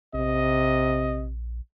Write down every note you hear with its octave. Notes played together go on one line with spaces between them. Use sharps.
A#1 C3 D#5